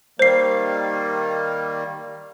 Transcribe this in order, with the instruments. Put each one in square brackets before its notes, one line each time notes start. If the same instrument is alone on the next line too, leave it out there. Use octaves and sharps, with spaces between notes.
[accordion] D#3 G3 A#3 [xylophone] C5 C7